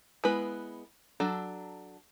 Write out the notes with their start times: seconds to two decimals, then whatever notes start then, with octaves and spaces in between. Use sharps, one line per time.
0.24 G#3 B3 E4 B4
1.20 F#3 D4 A4